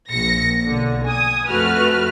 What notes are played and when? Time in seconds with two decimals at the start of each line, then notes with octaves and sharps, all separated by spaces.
0.10 A#1 A#6 C#7
0.66 B1 D3
1.06 G#5 D#6
1.48 F2 A3 F#4 B4 F6